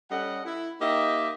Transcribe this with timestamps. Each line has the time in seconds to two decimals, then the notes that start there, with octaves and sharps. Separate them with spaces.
0.11 G3 C#4 A4 D#5 F#5
0.46 E4
0.81 A#3 D#4 G4 D#5 E5 G5